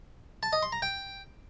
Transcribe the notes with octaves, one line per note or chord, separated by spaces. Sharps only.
A5
D#5
C6
A#5
G5